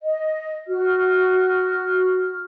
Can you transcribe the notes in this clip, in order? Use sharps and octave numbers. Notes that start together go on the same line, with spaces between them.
D#5
F#4 F6